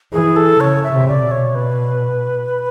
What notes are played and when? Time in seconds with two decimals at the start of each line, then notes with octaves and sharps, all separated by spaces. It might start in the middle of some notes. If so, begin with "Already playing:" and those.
0.12 E3 G#4
0.36 A4
0.60 C#3 C#5
0.84 E5
0.92 C#3
1.08 D5
1.23 B2
1.31 C#5
1.55 B4